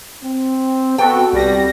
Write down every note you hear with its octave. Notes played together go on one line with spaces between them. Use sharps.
C4
B3 F#4 A4 G5
C2 G3 A#6